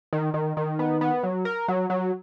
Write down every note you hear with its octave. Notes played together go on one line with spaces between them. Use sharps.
D#3
D#3
D#3
B3
B3
F#3
A#4
F#3
F#3